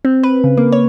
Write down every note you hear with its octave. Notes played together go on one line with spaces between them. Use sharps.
C4
B4
C#3
A#3
C#5